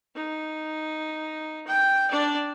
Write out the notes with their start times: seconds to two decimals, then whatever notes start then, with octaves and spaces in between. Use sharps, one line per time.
0.15 D#4
1.67 G5
2.10 D4 D5